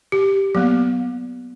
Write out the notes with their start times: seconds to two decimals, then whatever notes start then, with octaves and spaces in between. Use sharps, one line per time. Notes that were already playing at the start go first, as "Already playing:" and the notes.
0.12 G4
0.55 F#3 A#3 B3